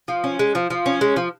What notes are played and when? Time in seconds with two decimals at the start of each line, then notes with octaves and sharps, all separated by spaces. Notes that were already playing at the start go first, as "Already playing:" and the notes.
0.08 F3
0.24 C#4
0.39 G#3
0.55 F3
0.70 F3
0.86 C#4
1.01 G#3
1.16 F3